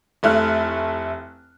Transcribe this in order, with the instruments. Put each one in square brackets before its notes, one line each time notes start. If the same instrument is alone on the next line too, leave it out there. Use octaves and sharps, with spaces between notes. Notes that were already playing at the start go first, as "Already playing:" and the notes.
[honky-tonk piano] F1 A3 E4 F6 F#6